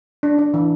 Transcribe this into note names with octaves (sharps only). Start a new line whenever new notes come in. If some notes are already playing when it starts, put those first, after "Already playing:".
D4
D4
E3